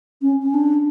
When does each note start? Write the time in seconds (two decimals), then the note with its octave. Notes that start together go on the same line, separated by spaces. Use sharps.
0.22 C#4
0.42 C#4
0.54 D4